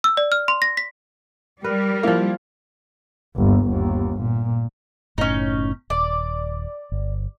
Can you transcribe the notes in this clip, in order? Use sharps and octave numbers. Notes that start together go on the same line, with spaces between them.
E6
D5
F6
C6
A#6
B6
G3 A#4 B4
F3 A#3 E4 F5
G1 D#2
G1 D#2
A#2
F#1 A2 C#4 D#4
D#1 D5
G1